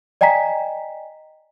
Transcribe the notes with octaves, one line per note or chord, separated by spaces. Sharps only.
D5 D#5 G5 G#5 A#5 B6